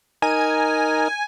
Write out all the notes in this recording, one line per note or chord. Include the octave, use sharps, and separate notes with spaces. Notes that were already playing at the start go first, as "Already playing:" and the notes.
D#4 A#4 G#5